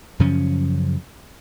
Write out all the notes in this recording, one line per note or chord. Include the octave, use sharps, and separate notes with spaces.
F#2 C#3 F3 C#4